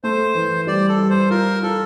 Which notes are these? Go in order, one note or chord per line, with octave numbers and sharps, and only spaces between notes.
A3 C5
E3
G3 D5
A4
G3
C5
F4 A#4
F4 A4